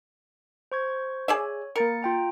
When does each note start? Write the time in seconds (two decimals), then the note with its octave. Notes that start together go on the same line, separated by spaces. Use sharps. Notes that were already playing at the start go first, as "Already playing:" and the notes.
0.72 C5 C#6 G#6
1.28 G#4 C#5 D5 E5
1.76 A#3 A#4 A6 C#7
2.03 F4 G5 A#5